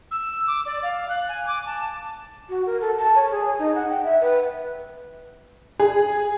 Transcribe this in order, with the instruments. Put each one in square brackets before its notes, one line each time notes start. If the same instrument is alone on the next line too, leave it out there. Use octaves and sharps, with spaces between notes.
[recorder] E6
D6
D5
F5
F#6
G#5
D6
A5
[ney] F#4
A#4
A4
A5
C#5
G#4
D#4
F#5
G5
E5
B4
[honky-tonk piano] G#4